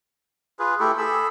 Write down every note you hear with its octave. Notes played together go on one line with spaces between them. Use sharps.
F4 G#4 B4
A3 E4 G4 A4
G#4 A4 B5 E6